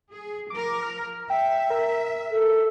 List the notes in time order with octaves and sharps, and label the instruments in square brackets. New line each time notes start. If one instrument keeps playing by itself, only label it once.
[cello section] G#4
[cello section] F3 A#4 [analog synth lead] D6
[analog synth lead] F6
[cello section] E5 [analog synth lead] G5
[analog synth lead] A#4
[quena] A4